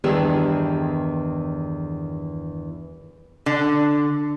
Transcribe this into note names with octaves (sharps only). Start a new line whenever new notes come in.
E2 G2 D#3 E3 G#4 E6
D3